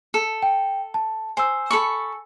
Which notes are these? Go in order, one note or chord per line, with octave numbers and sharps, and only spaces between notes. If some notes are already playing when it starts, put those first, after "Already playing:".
A4
G5
A5
C5 G#5 E6
A4 B5 C#6